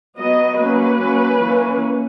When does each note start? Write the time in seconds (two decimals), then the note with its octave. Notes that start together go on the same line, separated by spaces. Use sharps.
0.18 F#3 B3 D#5
0.58 F#3 A#3 C#4 B4
1.01 F#3 A#3 C#4
1.42 E3 A#3 C#4